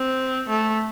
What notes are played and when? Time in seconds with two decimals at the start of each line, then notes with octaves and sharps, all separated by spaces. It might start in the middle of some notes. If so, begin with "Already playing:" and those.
Already playing: C4
0.49 A3